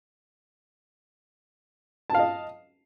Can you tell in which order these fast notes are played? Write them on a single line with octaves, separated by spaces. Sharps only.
A5 F5 D#5